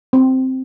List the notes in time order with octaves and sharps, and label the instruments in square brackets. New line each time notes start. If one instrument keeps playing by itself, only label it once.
[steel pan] C4